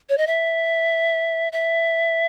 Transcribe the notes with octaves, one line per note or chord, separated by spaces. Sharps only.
C#5
D#5
E5
E5